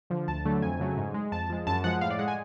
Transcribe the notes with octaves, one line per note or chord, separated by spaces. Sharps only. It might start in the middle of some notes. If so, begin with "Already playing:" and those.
D3 F3
D2 A5
D3 F#3 A3
F2 G#5
C#3 F#3 A3
G#2
G#3
F2 A5
F3 G#3
F#2 A5
F3 G#3 F#5
A2 F5
D5
G#3 F#5
G#5